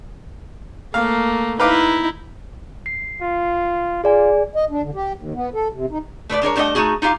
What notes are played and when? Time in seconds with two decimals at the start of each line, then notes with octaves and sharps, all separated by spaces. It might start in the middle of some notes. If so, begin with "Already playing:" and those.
0.94 A3 A#3 F5
1.60 D#4 E4 B4 F5 D6
2.86 C7
3.21 F4
4.04 F4 G#4 D5 G#5
4.56 D#5
4.70 D4
4.83 D3
4.95 G4
5.16 D#2
5.35 B3
5.54 A4
5.72 C3
5.90 D#4
6.29 A3 B4 C#5 D5
6.42 G#3 D4 A#4 C#5
6.56 G3 A3 D4 A#4 D#5 F#5
6.75 A3 A#3 D#4 F#4 G#4
7.02 D#4 F4 G4 F5